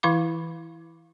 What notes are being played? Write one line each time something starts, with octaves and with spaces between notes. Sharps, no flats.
E3 E4 F5 B5 D6